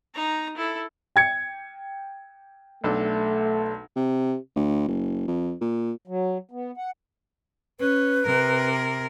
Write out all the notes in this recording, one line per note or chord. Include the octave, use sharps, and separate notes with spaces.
D#4 A#5
E4 A4
G5 G#6 C#7
B1 A3 D4 A4
C3
D2
F#1
F2
A#2
F#3
B3
F#5
C#4 B4
C3 A#4